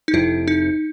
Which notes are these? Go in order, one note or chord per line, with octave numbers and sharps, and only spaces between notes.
D#4
F1 F2 C3 E4
D#4